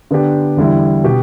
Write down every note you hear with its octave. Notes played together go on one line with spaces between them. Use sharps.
D3 B3 D4 G4
E2 D3 G3 E4
B2 B3 G4